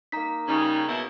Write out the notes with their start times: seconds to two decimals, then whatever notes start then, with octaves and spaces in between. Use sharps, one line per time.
0.12 A#3 D#4 A#5 B6
0.48 C#3 G3 D#4 G#4 C#5
0.88 B2 E4